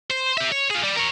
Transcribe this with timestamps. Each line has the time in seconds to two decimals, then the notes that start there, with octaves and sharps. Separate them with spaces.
0.11 C5
0.38 G4 E5
0.52 C#5
0.70 F4 G#4
0.83 G3 D5
0.96 A#4 C#5